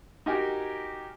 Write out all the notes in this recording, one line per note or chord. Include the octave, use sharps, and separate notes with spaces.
D#4 F#4 G4 A#4 G#5